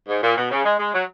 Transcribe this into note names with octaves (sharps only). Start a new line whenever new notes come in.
G#2
A#2
B2
C#3
G#3
G#3
F#3